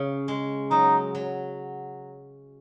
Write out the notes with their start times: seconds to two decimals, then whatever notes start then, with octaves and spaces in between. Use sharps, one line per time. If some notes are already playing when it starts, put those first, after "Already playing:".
Already playing: C#3
0.28 G#3
0.71 F#3 D#4
1.15 F#3